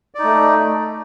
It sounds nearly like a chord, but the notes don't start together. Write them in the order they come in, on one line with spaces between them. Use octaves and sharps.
D5 D#4 A3